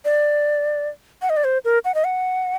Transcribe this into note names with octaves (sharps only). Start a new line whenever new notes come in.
D5
F#5
D#5
D5
C5
A#4
F#5
D#5
F#5